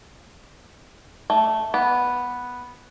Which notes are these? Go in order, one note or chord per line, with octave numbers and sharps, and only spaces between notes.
A3
B3